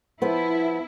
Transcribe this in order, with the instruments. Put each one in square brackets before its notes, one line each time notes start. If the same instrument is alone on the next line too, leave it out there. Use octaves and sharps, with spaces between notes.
[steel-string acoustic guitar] F3 B3 [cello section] E4